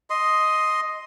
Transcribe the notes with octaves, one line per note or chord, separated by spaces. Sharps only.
D#5 C6